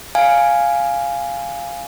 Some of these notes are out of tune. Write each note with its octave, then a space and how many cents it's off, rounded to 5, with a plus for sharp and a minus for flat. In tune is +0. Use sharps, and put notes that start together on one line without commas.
F5 +0 G#5 +0